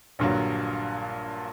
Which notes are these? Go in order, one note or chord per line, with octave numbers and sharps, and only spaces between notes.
A#1 G2 A#2 D3 F#3